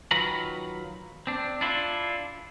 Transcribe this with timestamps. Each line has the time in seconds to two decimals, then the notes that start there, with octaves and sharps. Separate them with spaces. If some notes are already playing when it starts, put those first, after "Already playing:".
0.11 D#3 F#3 F4 B4 A#5 B5
1.27 C4 D4
1.61 D4 E4 F4